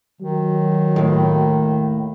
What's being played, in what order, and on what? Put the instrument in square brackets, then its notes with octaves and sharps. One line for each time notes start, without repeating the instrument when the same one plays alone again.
[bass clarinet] D#3 [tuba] F#3
[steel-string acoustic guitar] D#2 A2